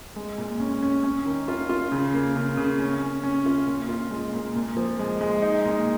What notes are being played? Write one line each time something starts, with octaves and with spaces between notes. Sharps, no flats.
G#3
A#2
C#4
C#4
C#4
D#3
F4
F4
C#3
A#3
C#3
C#3
C#4
C#4
C#4
F4
A#2
F4
G#3
A#2
A#2
F3
G#3
G#3
D#4
A#2